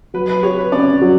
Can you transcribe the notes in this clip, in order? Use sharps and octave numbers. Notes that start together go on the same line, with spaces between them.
F#3 B4
B4
G4 C#5
B4
C#4 D5
F#3